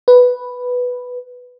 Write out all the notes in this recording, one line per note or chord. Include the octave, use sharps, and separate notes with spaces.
B4